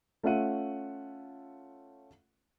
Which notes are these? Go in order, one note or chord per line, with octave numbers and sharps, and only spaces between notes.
A3 C#4 F4 E5 F#5 D#7